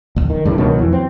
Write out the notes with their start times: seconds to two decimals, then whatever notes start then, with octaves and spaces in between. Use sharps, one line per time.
0.16 D1 D2
0.30 D#3
0.45 G2 C#3 E3
0.58 C#2 B2 D#3 F#3
0.79 F2 E3
0.93 C4